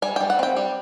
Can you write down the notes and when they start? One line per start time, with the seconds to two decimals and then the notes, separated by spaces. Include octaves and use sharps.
0.02 G3 G#5
0.16 G3 G5
0.30 F#5
0.39 C4 G5
0.56 G3